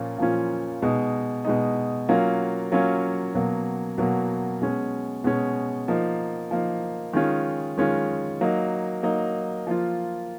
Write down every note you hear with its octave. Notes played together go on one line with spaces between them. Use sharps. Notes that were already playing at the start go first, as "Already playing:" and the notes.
Already playing: A#2 F3 A#3 C#4 F4
A#2 F3 A#3 C#4 F4
B2 G#3 D#4
B2 G#3 D#4
F#3 A#3 C#4 F4
F#3 A#3 C#4 F4
B2 F#3 A#3
B2 F#3 A#3
B2 G#3 C#4
B2 G#3 C#4
F3 A#3 D#4
F3 A#3 D#4
D#3 G#3 C#4 F4
D#3 G#3 C#4 F4
F#3 A#3 D#4
F#3 A#3 D#4
F3 A#3 F4